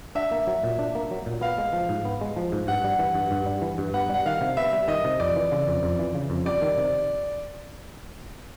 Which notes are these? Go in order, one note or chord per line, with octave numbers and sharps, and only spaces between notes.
D4 E5
A#3
F#3
A#2
D4
A#3
F#3
A#2
B3 F5
G#3
F3
G#2
B3
G#3
F3
G#2
G2 F#5
G3
E3
G2
G2
G3
E3
G2
B3 F#5
G3 F#5
D#3 F5
C3
B3 E5
G3
D#3 D#5
C3
F2 D5
E3
C#3
F2
F2
E3
C#3
F2
G3 D5
D#3
C3